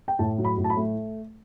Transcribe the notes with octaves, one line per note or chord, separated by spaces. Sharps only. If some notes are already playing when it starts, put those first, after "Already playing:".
G5
A2 A5
F#3
B5
A2
A5
B5
A3